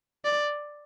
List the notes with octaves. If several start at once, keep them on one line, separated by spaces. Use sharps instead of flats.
D5